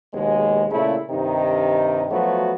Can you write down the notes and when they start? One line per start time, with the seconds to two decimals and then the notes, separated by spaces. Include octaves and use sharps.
0.13 A#1 D#2 B2 G#3
0.71 A#2 C#3 A3 E4
1.11 G2 C3 D#3 D#4
2.10 F3 F#3 A3 B3 F#4